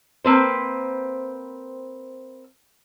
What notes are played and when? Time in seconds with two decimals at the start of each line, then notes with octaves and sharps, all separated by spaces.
0.24 A#3 C4 B4 C5